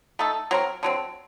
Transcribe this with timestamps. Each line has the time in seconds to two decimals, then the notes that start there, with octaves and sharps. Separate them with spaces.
0.19 A3 D#4 A4
0.51 F#3 C4 F#4 A#4
0.83 D3 F#3 C4